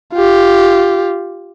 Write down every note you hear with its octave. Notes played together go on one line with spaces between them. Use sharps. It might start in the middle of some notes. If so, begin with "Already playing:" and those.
F4 G4